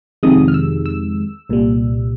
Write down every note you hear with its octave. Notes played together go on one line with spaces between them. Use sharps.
F2 C3 D#3 G#3 D#6
F6
E6
E6
C2 A#2 G3